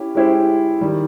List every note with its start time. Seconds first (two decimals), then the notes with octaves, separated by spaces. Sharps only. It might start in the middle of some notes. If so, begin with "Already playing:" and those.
Already playing: C#4 E4 G4
0.15 G#3 C#4 E4 G4 C5
0.81 D#3 G3